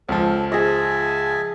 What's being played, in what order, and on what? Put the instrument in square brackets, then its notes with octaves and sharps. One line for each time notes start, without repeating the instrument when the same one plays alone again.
[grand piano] C#2 F3 [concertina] A4
[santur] G#4 D#5 [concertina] E5 G#5 A5